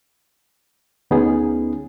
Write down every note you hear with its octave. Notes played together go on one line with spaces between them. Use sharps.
D2 B3 C#4 D#4 G#4